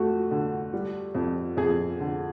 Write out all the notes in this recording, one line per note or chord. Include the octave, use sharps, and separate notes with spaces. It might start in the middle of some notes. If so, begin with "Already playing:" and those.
Already playing: F2 A3 F#4
D3
G3
F2
F2 G#4
D3